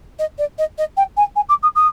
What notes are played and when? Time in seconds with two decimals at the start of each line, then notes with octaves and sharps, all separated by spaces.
0.19 D#5
0.38 D5
0.58 D#5
0.78 D#5
0.97 G5
1.17 G#5
1.36 G#5
1.49 D6
1.63 D#6
1.75 D#6